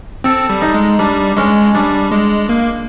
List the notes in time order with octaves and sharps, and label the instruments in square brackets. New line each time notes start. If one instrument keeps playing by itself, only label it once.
[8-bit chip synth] C4 [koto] A4
[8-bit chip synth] G3
[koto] D#4
[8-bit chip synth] G#3
[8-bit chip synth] G3 [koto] D4
[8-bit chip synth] G#3 [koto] C#4
[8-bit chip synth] G3 [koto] D4
[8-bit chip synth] G#3
A#3